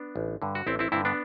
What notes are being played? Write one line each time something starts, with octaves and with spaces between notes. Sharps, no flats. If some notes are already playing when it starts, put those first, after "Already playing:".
Already playing: B3 D4
A1
G2 D3
F#4
A1 C4 E4
C4 E4
G2 D3 C4 E4
B3 D4